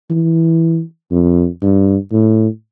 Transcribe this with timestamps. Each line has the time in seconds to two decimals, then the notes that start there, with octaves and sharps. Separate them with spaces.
0.10 E3
1.11 F2
1.62 G2
2.12 A2